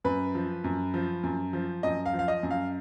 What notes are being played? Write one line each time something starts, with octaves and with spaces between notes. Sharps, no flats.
F#2 B4
F3
F#2
F3
F#2
F3
F#2 D#5
F5
F3
F5
D#5
F#2
F5